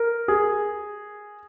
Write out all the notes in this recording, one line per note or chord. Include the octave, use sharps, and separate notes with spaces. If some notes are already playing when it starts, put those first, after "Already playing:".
Already playing: A#4
G#4